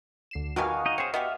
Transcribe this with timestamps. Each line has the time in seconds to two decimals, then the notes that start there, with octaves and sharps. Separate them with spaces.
0.31 D2 C7 E7
0.56 B2 D#3 G3 F#4 F5 G#5 D#6
0.86 D#4 D#5
0.98 C4 G#4 C5 C#5
1.14 B3 F#4 G4 D#5 E5 F6